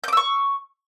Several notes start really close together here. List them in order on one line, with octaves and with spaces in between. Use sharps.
G6 D6 E6 C#6